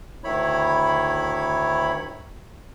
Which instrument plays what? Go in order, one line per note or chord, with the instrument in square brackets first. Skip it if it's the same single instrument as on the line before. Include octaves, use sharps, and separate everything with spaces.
[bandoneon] D2 D#3 E4 C#5 B5